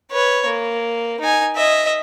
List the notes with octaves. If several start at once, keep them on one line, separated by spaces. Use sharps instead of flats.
B4 C#5
A#3
D#4 G#5
D#5 E5